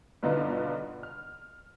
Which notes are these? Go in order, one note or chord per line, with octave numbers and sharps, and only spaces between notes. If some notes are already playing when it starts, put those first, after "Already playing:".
G2 B2 D3 B3 D#4 F4
F6